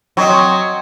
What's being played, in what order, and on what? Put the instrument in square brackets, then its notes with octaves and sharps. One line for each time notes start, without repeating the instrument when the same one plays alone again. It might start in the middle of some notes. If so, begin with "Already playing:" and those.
[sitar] F#3 [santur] C4 C#5 D#5